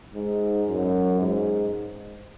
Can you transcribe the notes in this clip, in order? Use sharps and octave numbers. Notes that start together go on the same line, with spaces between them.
G#2
F#2
G#2